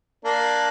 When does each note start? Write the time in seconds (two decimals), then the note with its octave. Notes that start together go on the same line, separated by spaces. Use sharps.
0.24 A#3 D4